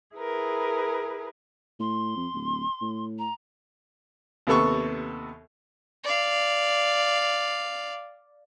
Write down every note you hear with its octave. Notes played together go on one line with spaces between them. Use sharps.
E4 G#4 A#4 B4
A2 C6
F2
D1
A2
A#5
D#2 C3 B3 A4 C#6
D5 F5